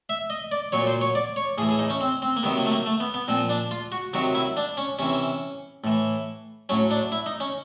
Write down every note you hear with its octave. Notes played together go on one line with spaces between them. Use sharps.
E5
D#5
D5
A#2 F#3 C#5
C5
C#5
D5
C#5
A2 E3 G#4
G#4
D#4
C#4
C4
C4
A#3
C3 D#3 F#3 B3
A#3
A3
A#3
A3
B3
B3
A#2 F3 C4
D4
F4
F#4
C3 D#3 F#3 F#4
E4
D4
C#4
C3 E3 C#4
A2 E3
A2 F#3 C#4
D4
E4
D#4
C#4